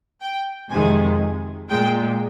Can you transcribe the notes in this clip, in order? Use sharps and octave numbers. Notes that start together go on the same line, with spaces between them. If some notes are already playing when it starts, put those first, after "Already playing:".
G5
F2 C3 D#3 G#3 G#5
A#2 G#3 G5